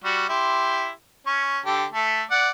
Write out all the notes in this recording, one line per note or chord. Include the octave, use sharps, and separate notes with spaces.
G3 F#4
E4 G4 C6
C#4 C#6
D3 G4 A4
A3 A4
D5 F#5